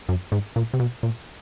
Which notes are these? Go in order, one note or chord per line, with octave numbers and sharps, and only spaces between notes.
F#2
G#2
A#2
C3
B2
A#2